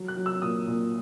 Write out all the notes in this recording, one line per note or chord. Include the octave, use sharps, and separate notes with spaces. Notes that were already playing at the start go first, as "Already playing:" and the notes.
Already playing: F#3
F#6
F#3
E6
A#2 D#6
A#2